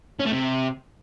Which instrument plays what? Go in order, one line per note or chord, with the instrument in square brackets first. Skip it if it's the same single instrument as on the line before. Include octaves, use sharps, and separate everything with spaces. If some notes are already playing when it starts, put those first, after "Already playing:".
[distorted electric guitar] C#4
A3
C3